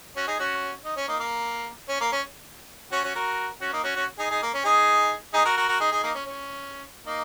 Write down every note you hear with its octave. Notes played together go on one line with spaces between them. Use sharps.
C#4 F#4
D#4 G#4
C#4 F#4
D#4
C#4
A#3 D#4
A#3
C#4
A#3
C#4
C#4 F#4
C#4 F#4
F#4 A#4
C#4 F#4
A#3 D#4
C#4 F#4
C#4 F#4
D#4 G#4
D#4 G#4
A#3
C#4
D#4 G#4
D#4 G#4
F#4 A#4
F#4 A#4
F#4 A#4
D#4 G#4
D#4 G#4
A#3 D#4
C#4
C#4
A#3 D#4